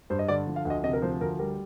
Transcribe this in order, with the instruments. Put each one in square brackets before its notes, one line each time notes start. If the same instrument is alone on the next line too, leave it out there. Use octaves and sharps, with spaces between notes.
[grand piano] G2 C5
D#5
D3 D5
F3
F5
D2 D#5
C3 D#5
A#4
F3 C5
D2 A#4
G3 A#4